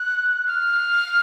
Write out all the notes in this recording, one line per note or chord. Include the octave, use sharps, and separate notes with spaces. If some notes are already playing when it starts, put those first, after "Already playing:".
Already playing: F#6
F6